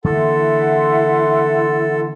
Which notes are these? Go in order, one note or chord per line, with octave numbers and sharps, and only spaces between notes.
D3 E3 A#3 E4 A4 E5 F#5 C6